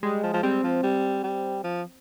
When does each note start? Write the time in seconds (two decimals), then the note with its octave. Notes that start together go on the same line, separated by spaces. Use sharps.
0.03 G3 G#3
0.23 F3
0.34 F3
0.43 G3 C4
0.63 F3
0.83 G3
1.23 G3
1.64 F3